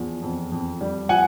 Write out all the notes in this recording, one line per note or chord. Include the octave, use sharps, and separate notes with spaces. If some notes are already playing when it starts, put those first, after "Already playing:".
Already playing: E2 F3
F2
F2
G3
F3 F#5 G#5